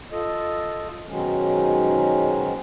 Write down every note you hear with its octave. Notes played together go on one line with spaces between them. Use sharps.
F4 A4 D#5
G#2 B2 D#3 F#3 G#3 C#4